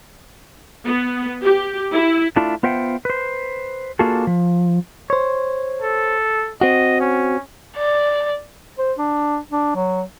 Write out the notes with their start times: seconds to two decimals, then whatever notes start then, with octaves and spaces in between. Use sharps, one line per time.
0.86 B3
1.42 G4
1.92 E4
2.36 A3 D4 E4 F4
2.63 B3 F4 C5 E5 F#5 G5
3.05 B4 C5
3.99 A#3 D4 F4 F#4 G#4 A4
4.27 F3
5.10 C5 C#5
5.82 A4
6.61 C4 F#4 D#5
7.00 C#4
7.77 D5
8.78 C5
8.98 D4
9.51 D4
9.75 F#3